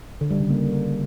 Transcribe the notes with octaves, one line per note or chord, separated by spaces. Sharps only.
D3
G3
C#3
A#3